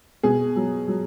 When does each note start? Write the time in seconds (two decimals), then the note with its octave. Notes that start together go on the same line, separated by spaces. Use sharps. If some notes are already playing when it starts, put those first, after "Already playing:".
0.23 B2 G#4
0.56 F#3
0.88 F#3